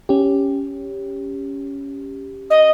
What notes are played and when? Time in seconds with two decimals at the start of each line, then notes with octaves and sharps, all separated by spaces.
0.09 C#4 G4
2.50 D#5